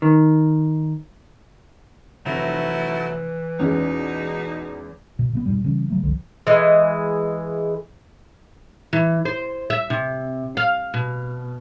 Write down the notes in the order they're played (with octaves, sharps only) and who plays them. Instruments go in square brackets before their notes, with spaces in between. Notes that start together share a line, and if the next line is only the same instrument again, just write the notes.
[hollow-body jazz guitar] D#3
[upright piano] F1 [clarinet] E3 [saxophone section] F#3 A3 E4 [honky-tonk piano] A#6 F7
[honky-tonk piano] E2 G#3 [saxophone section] B2 D#4 [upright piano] C#4
[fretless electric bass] B2
C3 G#3 B3
F2 G#2 B2 G3
C#3 E3 G3 C#4
C#3 F#3 A3
F#1 C2 D3 F3
[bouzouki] E3 G#3
[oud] E3
C5
E5
C3
F5
B2